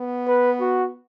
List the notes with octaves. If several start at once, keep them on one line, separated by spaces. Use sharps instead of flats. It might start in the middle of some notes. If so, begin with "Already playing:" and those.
Already playing: B3
B4
F#4